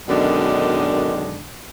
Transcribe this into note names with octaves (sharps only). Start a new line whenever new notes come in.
F#2 B2 D3 D#3 G#3 D4